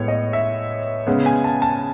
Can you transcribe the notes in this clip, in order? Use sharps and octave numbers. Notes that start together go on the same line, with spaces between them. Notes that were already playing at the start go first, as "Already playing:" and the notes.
Already playing: A2 G#3 B3 C#5
D#5
E5
C#3 G#3 B3
G#5
A5
A5